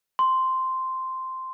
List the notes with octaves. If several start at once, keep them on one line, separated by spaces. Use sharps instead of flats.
C6